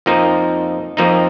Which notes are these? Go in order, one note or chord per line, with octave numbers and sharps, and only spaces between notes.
F2 F3 A#3 D#4
F2 F3 A#3 D#4